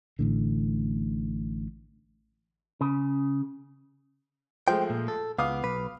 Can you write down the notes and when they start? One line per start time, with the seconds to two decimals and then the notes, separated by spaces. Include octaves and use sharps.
0.19 A1 A2 D3
2.81 C#3
4.68 F3 G#3 A3 C5 G5
4.90 A#2
5.08 A4
5.38 C#2 B3 F5 D6 D#6
5.64 B1 B4